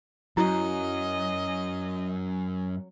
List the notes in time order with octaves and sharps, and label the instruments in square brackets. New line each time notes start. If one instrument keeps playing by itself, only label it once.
[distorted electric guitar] F#2 [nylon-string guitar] F#3 [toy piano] E4 [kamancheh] D#5